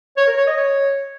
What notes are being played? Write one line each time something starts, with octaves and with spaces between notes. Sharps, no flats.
C#5
A#4
C#5
D#5
C#5